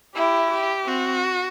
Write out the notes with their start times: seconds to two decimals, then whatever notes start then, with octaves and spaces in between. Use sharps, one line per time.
0.15 E4 G4
0.51 G4
0.87 C4 F#4